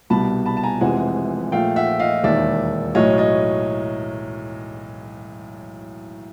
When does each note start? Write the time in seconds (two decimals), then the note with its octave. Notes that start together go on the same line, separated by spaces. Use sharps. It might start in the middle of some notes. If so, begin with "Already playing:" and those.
0.10 C2 B2 G3 A5 B5
0.46 A5 B5
0.57 A5
0.64 G#5 A#5
0.81 F1 F2 C3 E3 G#3 F#5 G#5
1.52 A#1 A#2 F3 A3 F5 G5
1.76 E5 F#5
2.00 D#5 F5
2.23 E1 D#2 D#3 D5 E5
2.95 B1 A2 F#3 C#5 D#5
3.18 C#5 D#5